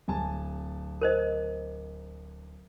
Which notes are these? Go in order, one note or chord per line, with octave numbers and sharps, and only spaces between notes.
D1 G#5 A5
A#4 C5 D#5